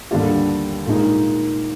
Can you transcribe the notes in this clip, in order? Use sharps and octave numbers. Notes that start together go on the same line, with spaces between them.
D#2 D3 G3 D4 F4
A#2 G#3 D#4